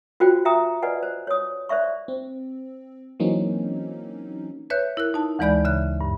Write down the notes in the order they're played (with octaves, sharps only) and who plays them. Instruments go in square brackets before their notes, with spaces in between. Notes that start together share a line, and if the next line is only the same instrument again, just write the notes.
[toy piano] F4 F#4 C5 G5
E5 G5 A#5 D#6
B4 D5 D#5 F#5 G#5
C5
C#5 D#6
C5 D5 E5 C#6
[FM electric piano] C4
E3 F#3 A#3 C4 C#4 D#4
[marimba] B4 C#5 E5 F#6 G6
E4 A#4 F#6
D#4 A5
D2 E3 G#3 D5 B5 G6
C#3 E5 F#6
G2